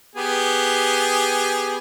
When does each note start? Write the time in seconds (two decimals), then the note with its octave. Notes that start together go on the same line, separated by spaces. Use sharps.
0.15 B3 G4 G#4